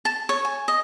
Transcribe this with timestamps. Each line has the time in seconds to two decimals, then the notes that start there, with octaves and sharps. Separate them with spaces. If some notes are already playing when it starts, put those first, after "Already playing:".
0.05 A5
0.29 C#5
0.45 G#5
0.68 D#5